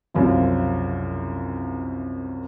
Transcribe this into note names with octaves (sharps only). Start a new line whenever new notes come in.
C2 F#2 C#3 F3